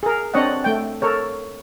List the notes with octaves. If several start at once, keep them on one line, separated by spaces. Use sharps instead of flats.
G#4 A#4
C4 D4 C#5 D#5 F#5
A3 G5
A4 A#4 C#5